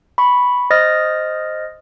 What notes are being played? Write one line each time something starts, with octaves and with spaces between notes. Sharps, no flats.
B5 C#6
C5 D#5 D#6 F6 A6 A#6